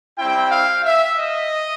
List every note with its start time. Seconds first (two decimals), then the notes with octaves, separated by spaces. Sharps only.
0.18 G3 C4 E4 G5
0.51 F5
0.84 E5
1.18 D#5